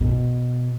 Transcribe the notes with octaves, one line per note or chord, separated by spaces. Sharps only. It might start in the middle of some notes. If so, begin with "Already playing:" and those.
B2